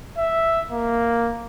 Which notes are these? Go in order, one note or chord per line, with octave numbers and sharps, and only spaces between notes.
E5
A#3